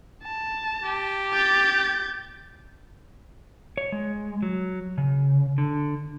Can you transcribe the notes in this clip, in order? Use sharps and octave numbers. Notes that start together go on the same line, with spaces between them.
A5
G4
G6 A6
C#5
G#3
F#3
C#3
D3